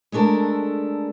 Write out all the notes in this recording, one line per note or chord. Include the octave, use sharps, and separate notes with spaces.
G#3 A3 D4 A4 A#4